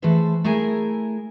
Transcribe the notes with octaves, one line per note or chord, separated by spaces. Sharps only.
E3 A3 G#4 A4 B4 C5
A3 E4 G#4 A#4 G#5